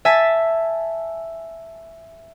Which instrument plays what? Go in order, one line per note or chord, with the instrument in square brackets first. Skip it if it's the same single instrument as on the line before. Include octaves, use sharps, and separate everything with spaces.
[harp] E5 G#5 A5 A6 B6